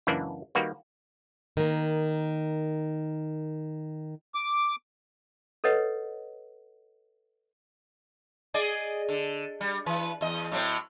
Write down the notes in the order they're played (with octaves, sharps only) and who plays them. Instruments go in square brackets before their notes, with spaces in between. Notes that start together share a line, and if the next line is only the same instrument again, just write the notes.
[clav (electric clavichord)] C#2 F#2 E3 A#3 D4 F#5
D#3 G3 A#3 F#4 B4
[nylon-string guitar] D#3 A#3
[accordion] D6
[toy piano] A4 B4 C#5 D#5 F#5
[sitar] G#4 D5 D#5
D3
G3
E3 B4
E2 D#5
A2 F#3 C4